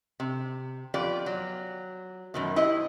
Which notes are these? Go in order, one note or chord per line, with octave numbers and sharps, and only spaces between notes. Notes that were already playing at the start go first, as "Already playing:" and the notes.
C3
F2 B3 F4 G4 D5
F#3
F#2 B2 D#3
E4 G4 C5 D#5